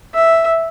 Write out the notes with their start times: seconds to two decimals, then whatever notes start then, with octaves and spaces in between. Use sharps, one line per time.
0.14 E5